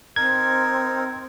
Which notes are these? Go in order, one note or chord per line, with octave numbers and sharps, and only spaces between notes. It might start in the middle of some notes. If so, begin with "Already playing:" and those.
C4 D#4 A#4 G#6